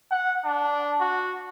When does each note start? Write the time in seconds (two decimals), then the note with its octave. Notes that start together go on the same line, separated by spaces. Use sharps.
0.11 F#5
0.45 D4
1.00 F#4